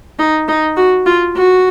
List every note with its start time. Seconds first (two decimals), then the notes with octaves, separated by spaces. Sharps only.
0.19 D#4
0.48 D#4
0.77 F#4
1.06 F4
1.36 F#4